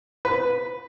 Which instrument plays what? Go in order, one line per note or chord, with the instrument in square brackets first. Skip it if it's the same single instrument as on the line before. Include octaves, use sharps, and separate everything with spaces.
[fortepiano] B4